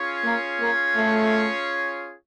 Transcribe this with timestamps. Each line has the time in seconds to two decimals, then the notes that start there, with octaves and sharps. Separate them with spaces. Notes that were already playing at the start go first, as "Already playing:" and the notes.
Already playing: C#4 F4 G#4 C#5
0.24 A#3
0.60 A#3
0.96 A3